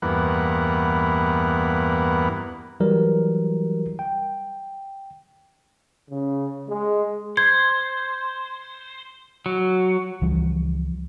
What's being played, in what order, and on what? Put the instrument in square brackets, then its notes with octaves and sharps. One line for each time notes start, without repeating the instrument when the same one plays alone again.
[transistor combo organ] E2 G2 A#3 B3 F#5
[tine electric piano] E3 F#3 G3 A#4
G5
[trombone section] C#3
G#3
[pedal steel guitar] C5 [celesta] G#6
[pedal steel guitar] F#3
[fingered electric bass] C#2 E3 F3 G3